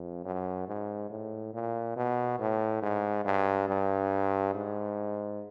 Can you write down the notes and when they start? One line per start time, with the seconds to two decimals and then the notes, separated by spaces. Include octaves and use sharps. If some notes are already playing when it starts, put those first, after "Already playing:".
Already playing: F2
0.24 F#2
0.68 G#2
1.10 A2
1.54 A#2
1.96 B2
2.40 A2
2.82 G#2
3.25 G2
3.68 G2
4.54 G#2